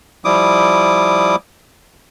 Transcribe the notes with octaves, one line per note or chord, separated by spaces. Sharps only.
F3 G3 E4 D6 D#6